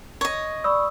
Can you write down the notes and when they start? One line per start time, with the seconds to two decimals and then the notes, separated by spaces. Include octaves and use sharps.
0.21 C#5 D#5
0.64 D5 B5 C#6 D#6 E6